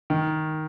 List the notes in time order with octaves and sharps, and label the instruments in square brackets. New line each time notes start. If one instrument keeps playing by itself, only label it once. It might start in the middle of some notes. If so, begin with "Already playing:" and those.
[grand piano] D#3